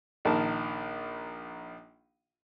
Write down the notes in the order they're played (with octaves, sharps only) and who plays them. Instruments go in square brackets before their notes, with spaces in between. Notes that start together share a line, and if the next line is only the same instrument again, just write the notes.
[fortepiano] A#1 D#3 A#4 A5